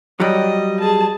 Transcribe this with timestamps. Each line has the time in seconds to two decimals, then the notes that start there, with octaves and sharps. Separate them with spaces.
0.20 F#3 G3 D#5
0.80 G#4 A5